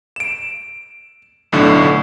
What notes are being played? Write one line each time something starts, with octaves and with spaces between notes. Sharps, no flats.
D7 E7
B1 A2 D3